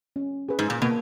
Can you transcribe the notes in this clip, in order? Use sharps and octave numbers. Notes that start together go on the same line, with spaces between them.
C#4
G#4 B4
G#2
A#2
B2 A#3